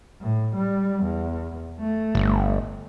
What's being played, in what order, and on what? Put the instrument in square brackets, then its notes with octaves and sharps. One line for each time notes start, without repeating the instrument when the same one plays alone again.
[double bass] A2
G3
E2
A3
[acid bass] G1